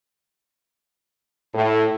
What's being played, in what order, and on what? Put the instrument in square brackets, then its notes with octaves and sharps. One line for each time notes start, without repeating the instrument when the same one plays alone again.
[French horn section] A2